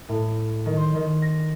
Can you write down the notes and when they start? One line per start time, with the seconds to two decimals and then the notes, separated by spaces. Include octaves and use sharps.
0.09 A2
0.66 D#3
0.77 C5
0.95 D#3
1.22 A#6